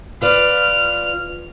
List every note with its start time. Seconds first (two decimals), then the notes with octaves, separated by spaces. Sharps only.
0.22 F4 B4 D5 F6